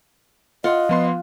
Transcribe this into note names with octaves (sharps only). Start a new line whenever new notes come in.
F4 D#5 F#5
F3 B3 C6